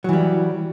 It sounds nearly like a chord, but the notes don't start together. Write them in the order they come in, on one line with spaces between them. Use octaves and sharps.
F#3 E3 G3